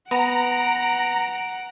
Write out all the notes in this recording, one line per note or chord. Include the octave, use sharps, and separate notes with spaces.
B3 F#5 A#5 D7